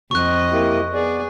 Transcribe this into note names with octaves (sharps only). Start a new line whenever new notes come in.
F2 D#5 C#6 F#6
A#3 E4 G4
B3 G#4 D5